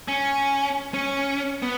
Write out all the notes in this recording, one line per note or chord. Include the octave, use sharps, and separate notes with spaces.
C#4
C#4
B3